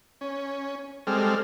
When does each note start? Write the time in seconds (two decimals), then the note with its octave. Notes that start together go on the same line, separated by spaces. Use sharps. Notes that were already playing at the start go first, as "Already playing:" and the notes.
0.21 C#4
1.07 G3 G#3 C4 A4 F6